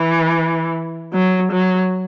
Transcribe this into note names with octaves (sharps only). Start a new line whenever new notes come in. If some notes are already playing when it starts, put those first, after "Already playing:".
Already playing: E3
F#3
F#3